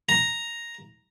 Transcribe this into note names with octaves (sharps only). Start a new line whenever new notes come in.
A#5